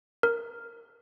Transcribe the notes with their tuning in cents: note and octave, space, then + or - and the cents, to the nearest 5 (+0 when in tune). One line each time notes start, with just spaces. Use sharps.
A#4 +0